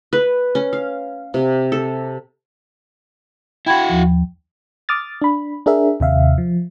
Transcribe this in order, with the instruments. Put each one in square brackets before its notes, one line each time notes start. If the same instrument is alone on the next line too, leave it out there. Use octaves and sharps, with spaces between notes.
[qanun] B4
C#4
F5
C3
A4
[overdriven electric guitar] E4 F#4 [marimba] G5 B5 G#6
[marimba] D#2 F3
[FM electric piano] D6 D#6 F6 A6
D4 B5
D4 G#4 A#4 E5
D#2 C3 E5 F5
F3